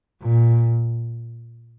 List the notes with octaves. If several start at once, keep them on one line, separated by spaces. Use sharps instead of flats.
A#2